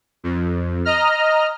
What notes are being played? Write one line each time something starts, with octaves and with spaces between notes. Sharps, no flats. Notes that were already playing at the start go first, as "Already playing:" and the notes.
F2
D#5 A#5 F6